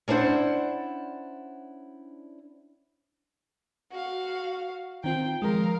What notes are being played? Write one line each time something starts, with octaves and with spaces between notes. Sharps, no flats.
C#4 D4 E4 C5 F#5
F#4 F5
D#3 C4 F4 G5
D#3 F3 G#3 A#4 F5